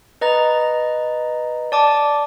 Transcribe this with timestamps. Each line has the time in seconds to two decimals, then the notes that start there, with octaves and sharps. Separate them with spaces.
0.21 B4 D#5 A#5 A6
1.72 D5 A5 D6